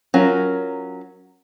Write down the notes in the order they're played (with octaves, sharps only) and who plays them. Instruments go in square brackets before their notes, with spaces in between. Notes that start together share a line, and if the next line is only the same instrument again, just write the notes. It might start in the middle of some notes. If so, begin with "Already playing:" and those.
[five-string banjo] F#3 C#4 F4 A#4